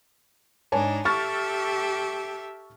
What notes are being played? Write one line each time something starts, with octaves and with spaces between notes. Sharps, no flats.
G#2 D4 D#4 C#5 G#5 A5
G4 A4 E5 C#6 F6 A6